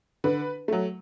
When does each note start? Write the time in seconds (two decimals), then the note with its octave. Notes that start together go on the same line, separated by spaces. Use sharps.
0.24 D3 B4
0.68 F#3 A3